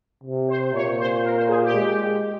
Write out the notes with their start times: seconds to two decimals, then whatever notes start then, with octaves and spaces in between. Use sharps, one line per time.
0.24 C3
0.48 C5
0.74 A#2 C#5
0.98 C5
1.24 A#4
1.37 C5
1.49 G#4
1.63 G4
1.74 G#3